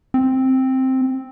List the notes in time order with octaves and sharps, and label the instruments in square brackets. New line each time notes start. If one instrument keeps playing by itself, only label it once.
[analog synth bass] C4